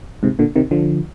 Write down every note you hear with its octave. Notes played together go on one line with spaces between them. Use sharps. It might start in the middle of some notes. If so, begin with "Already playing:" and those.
G#2 C3
A#2 D3
C3 D#3
D3 F3